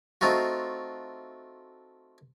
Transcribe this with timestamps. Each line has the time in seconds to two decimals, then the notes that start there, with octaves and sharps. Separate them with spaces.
0.21 A3 C4 D#4 F4 F#4